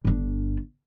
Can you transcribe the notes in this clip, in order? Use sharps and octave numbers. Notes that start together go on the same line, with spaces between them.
G1 D4